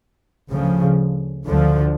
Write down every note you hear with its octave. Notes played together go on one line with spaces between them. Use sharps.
D2 C#3 F3
D2 D3 F3